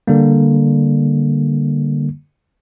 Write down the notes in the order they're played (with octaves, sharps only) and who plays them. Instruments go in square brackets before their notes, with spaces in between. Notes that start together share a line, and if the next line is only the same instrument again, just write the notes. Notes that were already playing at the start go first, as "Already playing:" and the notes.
[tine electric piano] D3 G3 A#3